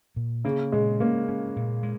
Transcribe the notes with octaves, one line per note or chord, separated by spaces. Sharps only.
A#2
C#3 A#3
A#2 G#3
A#3 C#4
C#4
A#2
G#3